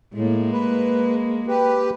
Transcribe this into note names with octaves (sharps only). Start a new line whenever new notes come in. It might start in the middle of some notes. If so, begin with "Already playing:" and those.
A2 G#3 A#3
B4
G4 B4